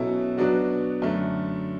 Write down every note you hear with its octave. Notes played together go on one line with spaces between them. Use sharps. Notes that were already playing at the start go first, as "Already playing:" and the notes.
Already playing: B2 F#3 C#4 E4 A4
B2 F#3 B3 D4 F#4
F#2 D3 A3